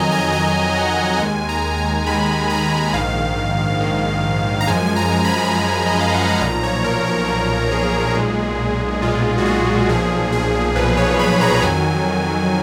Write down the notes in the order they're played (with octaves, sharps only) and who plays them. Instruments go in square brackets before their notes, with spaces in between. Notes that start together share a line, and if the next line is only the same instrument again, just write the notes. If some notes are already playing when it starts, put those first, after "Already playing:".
Already playing: [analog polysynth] F2 D#3 F#3 D#5 G#5 A#5
G#5
F2 D#3 F#3 G#5
F#5
D#2 D#3 G#3 G#5
A#5
A#5
D#2 D#3 G#3 B5
A#5
A#1 G#2 D#3 F5
A#1 G#2 D#3
A#5
F#2 F3 G#3 G#5
G#5
A#5
B5
F#2 F3 G#3 B5
D#5
F5
F#5
G#5
B1 A#2 F3 A#5
C#5
A#4
A#4
B1 A#2 F3 C#5
G#4
B1 A#2 G#3
B1 A#2 G#3 F4
F#4
G#4
B1 A#2 F3 G#4
G#4
B1 A#2 F3 B4
C#5
B5
A#5
F2 D#3 F#3 G#5